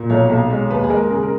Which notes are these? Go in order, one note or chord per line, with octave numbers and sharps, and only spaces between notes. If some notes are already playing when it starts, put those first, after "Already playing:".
Already playing: A#2
B1 C#5
B1
G#3
D#2 B4
G#4
G#3 A#4
A#4
C#3 G#4
A#4